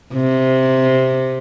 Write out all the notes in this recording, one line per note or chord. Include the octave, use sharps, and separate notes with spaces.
C3